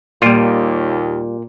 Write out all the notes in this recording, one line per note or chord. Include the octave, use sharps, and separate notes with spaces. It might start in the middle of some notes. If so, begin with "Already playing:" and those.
D#2 A#2 G3 F4